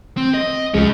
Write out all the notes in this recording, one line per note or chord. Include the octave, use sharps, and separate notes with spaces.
C4
D#5
C2 F3 F#3 G#3 C#4